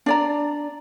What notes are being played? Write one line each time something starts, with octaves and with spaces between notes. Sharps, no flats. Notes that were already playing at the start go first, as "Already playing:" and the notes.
D4 D5 A#5